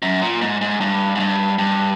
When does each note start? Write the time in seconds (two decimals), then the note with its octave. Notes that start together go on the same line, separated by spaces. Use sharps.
0.02 F#2
0.22 A#2
0.41 G#2
0.61 G#2
0.81 G2
1.15 G#2
1.20 G2
1.59 G2